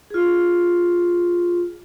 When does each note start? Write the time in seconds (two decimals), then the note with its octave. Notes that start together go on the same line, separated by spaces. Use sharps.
0.10 F4 G#4